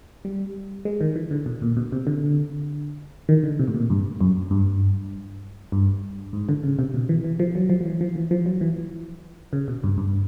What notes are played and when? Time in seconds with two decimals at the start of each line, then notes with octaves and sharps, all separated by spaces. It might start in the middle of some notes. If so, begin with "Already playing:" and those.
0.25 G3
0.85 G#3
1.01 D#3
1.16 E3
1.31 D3
1.46 B2
1.62 A#2
1.76 B2
1.92 C3
2.07 D3
3.29 D#3
3.44 D3
3.59 C3
3.68 A2
3.74 A#2
3.90 G2
4.21 F#2
4.51 G2
5.72 G2
6.33 G#2
6.49 D3
6.63 C#3
6.79 C3
6.94 B2
7.09 E3
7.24 E3
7.40 F3
7.55 F#3
7.70 F3
7.81 F3
7.86 E3
8.01 F3
8.16 E3
8.31 F3
8.46 F#3
8.61 E3
9.53 C#3
9.68 B2
9.84 G2
9.98 G2